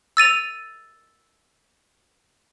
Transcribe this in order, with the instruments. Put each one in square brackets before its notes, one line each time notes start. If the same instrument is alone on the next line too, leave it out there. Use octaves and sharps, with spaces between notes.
[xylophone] E6 A6 D#7 F7